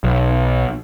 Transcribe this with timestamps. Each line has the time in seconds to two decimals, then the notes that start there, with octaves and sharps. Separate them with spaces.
0.04 B1